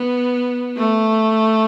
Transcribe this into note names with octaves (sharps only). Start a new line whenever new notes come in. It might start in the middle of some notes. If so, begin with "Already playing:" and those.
Already playing: B3
A3